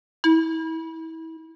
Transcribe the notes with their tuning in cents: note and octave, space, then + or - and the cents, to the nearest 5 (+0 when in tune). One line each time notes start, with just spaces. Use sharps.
E4 -30